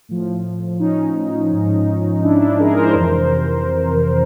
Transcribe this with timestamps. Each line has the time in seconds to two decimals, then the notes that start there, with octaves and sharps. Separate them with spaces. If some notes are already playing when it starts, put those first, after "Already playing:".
0.09 A2 F3
0.80 C#4 D#4
1.52 G#2 F3
2.23 D4 E4
2.41 D4 E4
2.59 G#4 A#4
2.77 A#4 C5
2.95 F2 C3 E3 A#4 C5